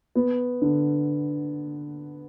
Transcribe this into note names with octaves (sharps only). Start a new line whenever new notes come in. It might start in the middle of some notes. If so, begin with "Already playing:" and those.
B3
D3